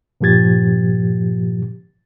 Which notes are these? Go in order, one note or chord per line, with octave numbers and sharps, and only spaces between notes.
G2 A#2 F3 G4 G#6 A6